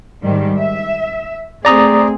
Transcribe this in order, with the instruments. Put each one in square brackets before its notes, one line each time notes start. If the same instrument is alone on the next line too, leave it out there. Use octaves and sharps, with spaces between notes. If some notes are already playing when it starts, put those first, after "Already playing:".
[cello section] G#2 D#3 G3
E5
[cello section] A3 C4 G#4 [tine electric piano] D5 A#5 D#6